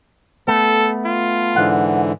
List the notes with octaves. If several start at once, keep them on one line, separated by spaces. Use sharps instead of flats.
A3 B3 A4
F4
G#2 D3 E3 F#5